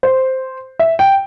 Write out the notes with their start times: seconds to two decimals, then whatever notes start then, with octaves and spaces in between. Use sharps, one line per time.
0.03 C5
0.79 E5
0.99 G5